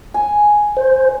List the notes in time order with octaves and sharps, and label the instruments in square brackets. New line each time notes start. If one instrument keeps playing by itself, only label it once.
[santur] G#5
[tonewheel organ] C5